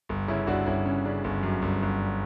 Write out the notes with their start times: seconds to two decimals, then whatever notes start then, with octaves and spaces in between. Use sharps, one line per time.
0.09 G1
0.28 C#3 C#4 E4
0.47 G1 D4 F#4
0.66 G1 C#4 E4
0.86 C#3 C#4
1.05 C#3 D4
1.24 G1
1.43 F#2
1.62 G1
1.82 G1